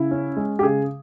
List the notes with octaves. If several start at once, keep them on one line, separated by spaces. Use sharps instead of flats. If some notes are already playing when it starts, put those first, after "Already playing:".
Already playing: C#3 E4
C#4
G#3
G4
C#3 G#4